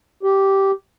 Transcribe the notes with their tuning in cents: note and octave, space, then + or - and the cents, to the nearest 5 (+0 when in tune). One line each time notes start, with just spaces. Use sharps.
G4 -10